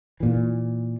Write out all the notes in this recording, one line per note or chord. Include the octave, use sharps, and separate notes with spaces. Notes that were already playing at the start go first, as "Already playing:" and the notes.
A#2 E3